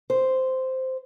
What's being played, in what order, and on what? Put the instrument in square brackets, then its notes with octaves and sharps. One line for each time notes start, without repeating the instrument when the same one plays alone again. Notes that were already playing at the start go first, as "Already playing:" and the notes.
[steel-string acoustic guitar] C5